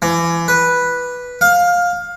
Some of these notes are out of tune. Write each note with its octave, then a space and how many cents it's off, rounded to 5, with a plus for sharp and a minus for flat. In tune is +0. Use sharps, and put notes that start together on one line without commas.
E3 +30
B4 -5
F5 +15